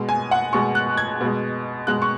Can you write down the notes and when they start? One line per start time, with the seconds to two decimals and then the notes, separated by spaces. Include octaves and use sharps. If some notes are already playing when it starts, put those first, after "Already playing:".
Already playing: B2 G#3
0.09 G#5
0.31 F#5
0.53 B2 G#3 C#6
0.75 F#6
0.97 G#6
1.21 B2 G#3
1.87 B2 G#3 F#6
2.02 C#6